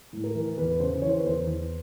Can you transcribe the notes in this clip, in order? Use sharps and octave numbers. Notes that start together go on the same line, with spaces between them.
A2
A#4
E3
E2 B4
C#3 C5
E3 C#5
C5
B4
E2 C5
E2